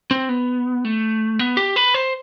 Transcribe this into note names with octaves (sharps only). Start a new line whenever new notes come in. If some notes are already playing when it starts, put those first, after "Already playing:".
C4
B3
A3
B3
G4
B4
C5